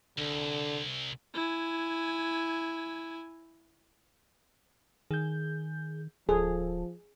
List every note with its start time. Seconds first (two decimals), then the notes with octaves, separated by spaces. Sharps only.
0.18 C2 D3
1.34 E4 G#5
5.11 D#3 G#4 G6
6.29 D1 F3 G#4 A4